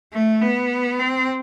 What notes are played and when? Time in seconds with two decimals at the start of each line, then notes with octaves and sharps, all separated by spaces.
0.13 A3
0.42 B3
0.99 C4